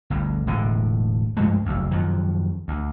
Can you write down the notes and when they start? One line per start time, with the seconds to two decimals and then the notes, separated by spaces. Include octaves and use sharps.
0.10 G1 D2 G2
0.47 E1 A2 D3
1.37 G2 F3 G#3 A3
1.65 F#1 D2
1.91 F#2 D#3 F3 F#3
2.68 D2